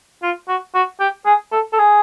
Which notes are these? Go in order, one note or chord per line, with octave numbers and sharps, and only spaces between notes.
F4
F#4
F#4
G4
G#4
A4
A4
G#4